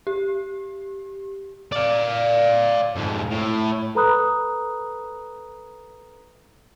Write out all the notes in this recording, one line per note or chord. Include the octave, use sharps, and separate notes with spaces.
G4
D5 F5
F2 G#2
A2
A4 B4 A#5 B5 D#6 F#6